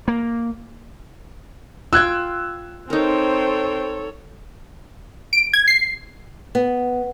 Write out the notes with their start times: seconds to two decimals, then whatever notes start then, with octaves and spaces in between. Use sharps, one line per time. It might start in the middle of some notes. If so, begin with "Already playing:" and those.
0.08 A#3
1.93 F4 G5 E6 F#6 G#6
2.90 C4 D#4 A4 A#4 C5 C#5 G5
5.33 D7
5.53 G#6
5.68 C7
6.55 B3